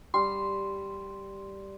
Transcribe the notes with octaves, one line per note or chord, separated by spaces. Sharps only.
G3 C6